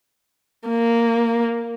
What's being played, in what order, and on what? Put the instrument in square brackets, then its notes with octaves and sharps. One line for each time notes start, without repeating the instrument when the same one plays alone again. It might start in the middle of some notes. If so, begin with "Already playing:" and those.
[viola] A#3